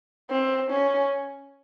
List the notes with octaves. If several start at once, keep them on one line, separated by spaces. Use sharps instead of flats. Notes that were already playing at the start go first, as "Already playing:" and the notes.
C4
C#4